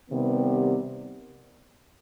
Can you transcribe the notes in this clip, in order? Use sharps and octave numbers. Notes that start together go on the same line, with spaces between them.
C3 D#3 G3 B3